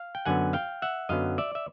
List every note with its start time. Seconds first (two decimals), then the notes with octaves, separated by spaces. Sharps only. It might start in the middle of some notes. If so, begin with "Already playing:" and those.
Already playing: F5
0.15 G5
0.26 F#2 D3 F#3 B3 F#5 G#5
0.53 F5 G5
0.82 E5 F#5
1.09 F#2 D3 F#3 B3 D#5 F5
1.38 D5 E5
1.55 E5